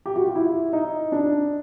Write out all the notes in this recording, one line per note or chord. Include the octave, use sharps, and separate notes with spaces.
G4
F#4
F4
E4
D#4
D4